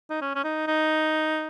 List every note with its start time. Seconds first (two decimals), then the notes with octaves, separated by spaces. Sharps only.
0.10 D#4
0.21 C#4
0.35 C#4
0.44 D#4
0.67 D#4